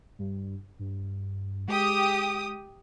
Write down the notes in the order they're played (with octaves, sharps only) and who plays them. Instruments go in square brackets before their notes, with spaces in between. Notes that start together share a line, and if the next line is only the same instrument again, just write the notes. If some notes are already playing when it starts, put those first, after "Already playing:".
[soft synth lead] G2
G2
[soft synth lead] G#3 [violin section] G4 D#6